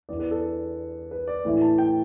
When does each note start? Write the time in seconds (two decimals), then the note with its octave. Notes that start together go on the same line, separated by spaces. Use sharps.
0.09 E2 E3 B3 D5
0.20 B4
0.31 A4
1.11 B4
1.27 D5
1.45 A2 E3 A3 E4
1.62 A5
1.78 G5